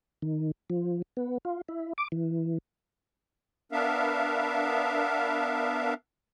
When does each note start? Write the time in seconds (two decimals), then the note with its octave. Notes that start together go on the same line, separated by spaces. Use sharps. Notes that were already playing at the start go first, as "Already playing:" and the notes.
0.22 D#3
0.70 F3
1.17 B3
1.45 F4
1.68 E4
1.98 D6
2.12 E3
3.72 B3 D4 A#4 E5 F5